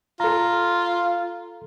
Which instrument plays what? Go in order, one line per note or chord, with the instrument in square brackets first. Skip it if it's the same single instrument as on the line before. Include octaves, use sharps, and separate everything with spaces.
[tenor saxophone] F4 [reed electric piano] A4 A#5